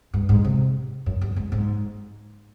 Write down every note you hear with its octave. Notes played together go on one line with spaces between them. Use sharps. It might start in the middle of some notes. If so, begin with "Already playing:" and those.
G2
G#2
C3
F#2
G2
G#2
G#2